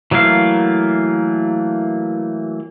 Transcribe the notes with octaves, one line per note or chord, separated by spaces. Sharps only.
E3 F#3 A3 A#3 F5